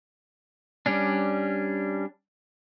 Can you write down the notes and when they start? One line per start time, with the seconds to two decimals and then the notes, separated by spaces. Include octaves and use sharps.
0.86 G3 C#4 D4